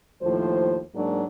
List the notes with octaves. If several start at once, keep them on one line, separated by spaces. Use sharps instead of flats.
D#2 A2 F3 C5
G#2 F#3 A#3 D4